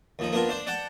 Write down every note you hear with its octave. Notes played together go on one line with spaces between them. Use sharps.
D#2 F3 D#4
A#3 B3 D4 F4 A#4
D4 C5 D5
D5 F#5 G5 A5 D6